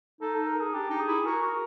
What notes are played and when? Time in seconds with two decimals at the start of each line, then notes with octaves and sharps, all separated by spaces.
0.21 D#4 A4
0.34 A4
0.47 A#4
0.60 G#4
0.73 D4 G4
0.90 D#4
1.00 G#4
1.08 E4
1.26 F#4 A#4
1.43 F#4